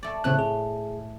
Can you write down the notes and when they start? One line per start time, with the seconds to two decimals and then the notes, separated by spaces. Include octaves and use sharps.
0.03 A3 D5
0.24 A2 C#3 A3 C4 F#6
0.39 G#4